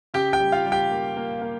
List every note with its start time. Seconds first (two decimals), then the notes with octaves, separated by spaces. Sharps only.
0.14 C#3 G4 G5
0.33 G4 G5
0.40 G3
0.52 F4 F5
0.66 G3
0.72 G4 G5
0.91 A#3
1.17 A#3
1.42 A#3